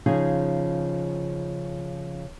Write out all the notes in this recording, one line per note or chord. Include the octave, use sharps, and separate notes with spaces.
C#3 F3 D#4 G#4